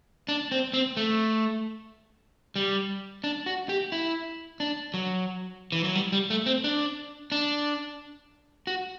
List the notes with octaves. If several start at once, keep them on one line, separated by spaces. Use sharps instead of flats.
D4
C4
C4
A3
G3
D4
F#4
G4
E4
D4
F#3
E3
F#3
G3
G3
A3
C4
D4
D4
F#4